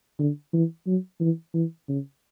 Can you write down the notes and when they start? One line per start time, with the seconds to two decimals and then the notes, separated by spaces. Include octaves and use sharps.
0.19 D3
0.53 E3
0.87 F#3
1.20 E3
1.54 E3
1.89 C#3